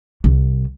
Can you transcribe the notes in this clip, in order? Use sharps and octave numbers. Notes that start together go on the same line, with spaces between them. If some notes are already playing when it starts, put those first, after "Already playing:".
C2